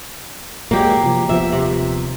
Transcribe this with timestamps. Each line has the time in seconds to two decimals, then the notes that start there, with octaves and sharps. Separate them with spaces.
0.71 A#2 F#3 G#3 A#3 G4
1.04 C3 F3
1.29 D#1 F3 B3 E5
1.52 C3